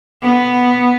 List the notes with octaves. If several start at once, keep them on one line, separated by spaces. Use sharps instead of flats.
B3